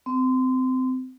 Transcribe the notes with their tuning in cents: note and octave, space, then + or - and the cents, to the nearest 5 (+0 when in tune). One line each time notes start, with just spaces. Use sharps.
C4 -25